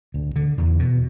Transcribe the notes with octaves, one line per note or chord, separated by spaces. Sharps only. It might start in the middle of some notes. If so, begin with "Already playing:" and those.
D2
D3
E2
B2